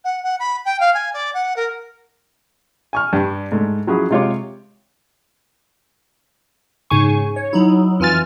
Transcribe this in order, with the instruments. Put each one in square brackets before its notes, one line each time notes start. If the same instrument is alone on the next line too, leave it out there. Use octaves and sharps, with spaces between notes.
[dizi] F#5
F#5
B5
G5
F5
G#5
D5
F#5
A#4
[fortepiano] G#5 C#6 F6
G2 G3 D4
G#2 A3
F3 F#3 C#4 E4 G#4
C3 G#3 F4 G4 C#5 D6
[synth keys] G#2 C#3 G#5 C#6
C#5
F#3 D#4 E4
F2 E3 F4 G#5 F6 A6